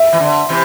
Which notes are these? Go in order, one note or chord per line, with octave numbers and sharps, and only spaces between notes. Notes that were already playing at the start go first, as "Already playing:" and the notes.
Already playing: E5
E3
D3
C3 E3